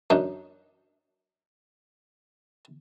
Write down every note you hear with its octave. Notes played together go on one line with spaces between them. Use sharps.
F#2 D4 D#4